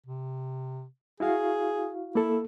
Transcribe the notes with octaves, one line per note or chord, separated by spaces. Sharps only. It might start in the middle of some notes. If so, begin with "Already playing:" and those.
C3
E4 F#4 G#4 F5
A#3 E4 A4